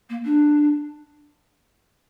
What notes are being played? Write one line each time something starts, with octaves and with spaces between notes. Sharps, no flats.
A#3
D4